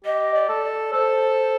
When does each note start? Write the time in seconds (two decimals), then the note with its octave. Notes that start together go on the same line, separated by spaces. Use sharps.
0.05 G4 D#5
0.35 D5
0.49 A4
0.64 D5
0.93 A4 C5